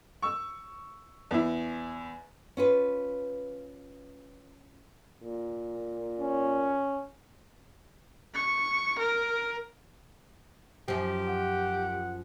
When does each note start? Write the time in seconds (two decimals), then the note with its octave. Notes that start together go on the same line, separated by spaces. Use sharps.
0.22 C#6 E6
1.31 E2 E4
2.57 C#4 F4 B4
5.23 A#2
6.19 C#4
8.34 C#6
8.99 A#4
10.88 F#2 F3 G4
11.29 F#5